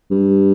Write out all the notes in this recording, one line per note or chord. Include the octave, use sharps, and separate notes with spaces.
G2